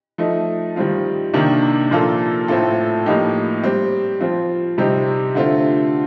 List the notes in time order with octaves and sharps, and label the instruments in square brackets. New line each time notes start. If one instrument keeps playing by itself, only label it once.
[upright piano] F3 A3 D#4
D#3 G3 C4 F4
C3 D#3 A#3 D4 G4
A#2 F3 A#3 F4 A4
A2 A3 C4 F4 A4
A2 F3 A#3 D#4 G4
G3 C4 G4
F3 C4 F4
C3 G3 C4 D#4 G4
D3 A3 C4 F4